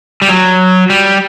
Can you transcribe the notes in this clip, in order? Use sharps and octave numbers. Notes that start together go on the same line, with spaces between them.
G3
F#3
G3